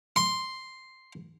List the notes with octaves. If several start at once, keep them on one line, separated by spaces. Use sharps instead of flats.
C6